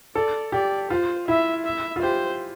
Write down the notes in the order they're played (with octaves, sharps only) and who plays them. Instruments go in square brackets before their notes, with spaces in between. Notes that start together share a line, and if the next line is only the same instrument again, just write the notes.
[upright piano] A4 [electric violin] D5
[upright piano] G4 [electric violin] D5
[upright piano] F4 [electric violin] C5
[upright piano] E4 [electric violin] E5
[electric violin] E5
[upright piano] F4
[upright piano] G4 [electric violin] C5